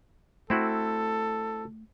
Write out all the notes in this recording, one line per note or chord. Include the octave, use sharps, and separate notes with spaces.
A3 C4 E4 F#4 A4